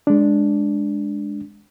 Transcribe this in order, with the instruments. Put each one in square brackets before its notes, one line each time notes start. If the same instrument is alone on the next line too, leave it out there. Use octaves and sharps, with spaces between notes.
[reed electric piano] G#3 D4